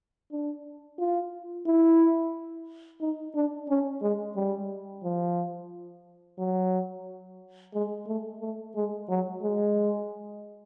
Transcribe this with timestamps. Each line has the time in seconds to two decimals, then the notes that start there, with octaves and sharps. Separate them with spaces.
0.31 D4
0.99 F4
1.66 E4
3.01 D#4
3.35 D4
3.69 C#4
4.02 G#3
4.36 G3
5.03 F3
6.39 F#3
7.74 G#3
8.07 A3
8.41 A3
8.75 G#3
9.09 F#3
9.42 G#3